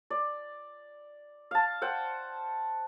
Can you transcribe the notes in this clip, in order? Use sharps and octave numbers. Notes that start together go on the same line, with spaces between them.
D5
F5 A5
C5 F#5 G5